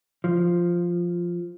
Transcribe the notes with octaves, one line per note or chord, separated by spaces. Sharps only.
F3